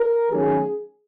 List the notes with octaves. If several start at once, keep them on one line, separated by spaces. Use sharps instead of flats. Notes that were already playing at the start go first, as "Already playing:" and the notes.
Already playing: A#4
D#3 F#3 A3 C#4 G#4